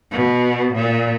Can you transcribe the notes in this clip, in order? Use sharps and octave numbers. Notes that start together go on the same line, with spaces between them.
B2
A#2